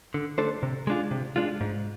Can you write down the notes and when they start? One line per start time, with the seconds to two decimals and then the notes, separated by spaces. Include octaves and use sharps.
0.14 D3
0.38 A3 D4 A4 C5
0.63 C3
0.87 G#3 D4 F4
1.11 C3
1.36 G#3 D4 F4
1.61 G#2